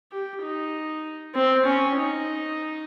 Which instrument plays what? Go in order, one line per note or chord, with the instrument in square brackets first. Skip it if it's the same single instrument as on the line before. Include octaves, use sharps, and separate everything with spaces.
[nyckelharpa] G4
D#4
C4
C#4
D#4